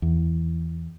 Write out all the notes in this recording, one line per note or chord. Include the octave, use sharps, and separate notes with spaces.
E2